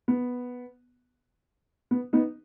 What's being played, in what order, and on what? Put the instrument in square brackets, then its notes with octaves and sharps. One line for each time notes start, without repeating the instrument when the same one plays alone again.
[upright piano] B3
B3
B3 D#4